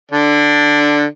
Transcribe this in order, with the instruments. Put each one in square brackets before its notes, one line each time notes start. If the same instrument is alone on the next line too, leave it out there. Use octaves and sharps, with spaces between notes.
[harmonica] D3 D4